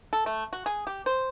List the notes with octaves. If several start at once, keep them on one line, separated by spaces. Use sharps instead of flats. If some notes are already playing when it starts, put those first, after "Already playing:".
A4
A3
F#4
G#4
G4
C5